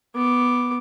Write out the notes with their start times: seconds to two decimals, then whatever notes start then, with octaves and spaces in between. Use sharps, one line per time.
0.15 B3 D6